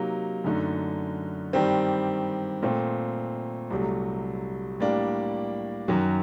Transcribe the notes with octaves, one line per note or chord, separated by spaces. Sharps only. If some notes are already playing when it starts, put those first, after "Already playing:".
Already playing: C3 F#3 A#3 D#4
F#2 D3 A3 D#4 A4
G2 D#3 G3 C4 G4
A#2 A3 C4
C2 C3 F#3 A3
A2 G3 A#3 D4
F#2 D#3 F#3